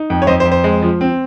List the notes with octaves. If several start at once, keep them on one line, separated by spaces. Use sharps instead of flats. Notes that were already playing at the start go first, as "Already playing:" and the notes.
Already playing: D#4
F2
C#5
F2 C5 D#5
C5
F2
C5
G#3
F3
C4